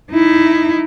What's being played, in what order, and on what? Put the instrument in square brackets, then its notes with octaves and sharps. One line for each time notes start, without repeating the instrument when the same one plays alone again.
[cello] D#4 E4